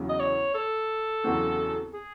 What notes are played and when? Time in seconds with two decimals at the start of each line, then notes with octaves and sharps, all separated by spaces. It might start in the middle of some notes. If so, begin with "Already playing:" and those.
Already playing: E2 C#3 F#3
0.09 D#5
0.20 C#5
0.54 A4
1.24 E2 C#3 F#3 C4 F#4
1.93 G#4